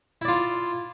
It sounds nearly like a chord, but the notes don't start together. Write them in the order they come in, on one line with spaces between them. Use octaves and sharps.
E4 D5 F4